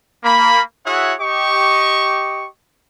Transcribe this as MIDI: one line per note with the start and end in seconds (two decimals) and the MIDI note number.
0.24 0.61 58
0.24 0.61 83
0.85 1.13 64
0.85 1.13 66
0.85 1.13 68
0.85 1.13 73
0.85 1.13 76
0.85 1.13 78
1.20 2.46 67
1.20 2.46 75
1.20 2.46 85